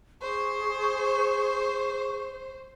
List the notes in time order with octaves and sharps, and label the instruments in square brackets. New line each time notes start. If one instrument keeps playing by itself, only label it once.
[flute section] G#4 C#6 [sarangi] C5